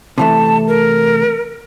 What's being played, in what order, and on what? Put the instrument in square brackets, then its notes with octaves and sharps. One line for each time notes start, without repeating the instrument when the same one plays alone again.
[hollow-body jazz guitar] C3 E3 A3 [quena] A5
[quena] A#4